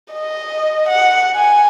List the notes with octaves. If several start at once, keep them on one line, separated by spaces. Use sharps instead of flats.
D#5
F#5
G#5